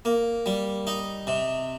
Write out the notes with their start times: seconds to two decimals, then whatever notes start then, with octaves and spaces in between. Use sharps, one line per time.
0.05 A#3
0.46 G3
0.87 D#4
1.27 C3